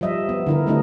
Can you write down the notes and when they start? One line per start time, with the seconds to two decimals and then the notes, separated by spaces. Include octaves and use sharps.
0.01 F3 G3 D#5 E5
0.29 B3
0.47 D3 E4 A#4
0.67 G3 A3 B3 D4 E4 D#5